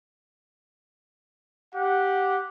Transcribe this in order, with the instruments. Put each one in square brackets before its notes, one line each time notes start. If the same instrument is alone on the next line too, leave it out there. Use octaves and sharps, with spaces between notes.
[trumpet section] G4 F#5